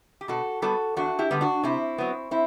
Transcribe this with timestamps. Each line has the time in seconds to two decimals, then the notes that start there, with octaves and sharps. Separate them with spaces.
0.21 G4
0.28 B2 F#4 A4
0.62 G3 B3 F#4 A4
0.97 E2 D4 F#4
1.19 E4 G4
1.31 D3 G3 B3
1.41 D4 F#4
1.63 C3 C4 E4
1.98 F#3 B3
2.31 C4 E4